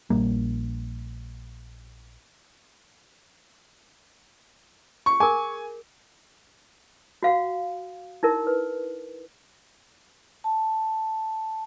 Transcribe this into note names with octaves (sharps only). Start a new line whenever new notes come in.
A#1 G3 A#3
C#6
G#4 A#4 G#5
F#4 F5 F#5
D#4 E4 A#4
B4
A5